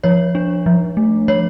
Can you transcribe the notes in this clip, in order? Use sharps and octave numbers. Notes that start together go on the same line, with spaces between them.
F3 C#5
D4
F3
A3
F3 C#5